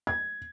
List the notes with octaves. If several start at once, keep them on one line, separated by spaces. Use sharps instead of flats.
G#6